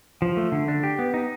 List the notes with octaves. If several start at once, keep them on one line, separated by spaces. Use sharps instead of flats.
F3
A3
D3
D4
G4
B3
D#4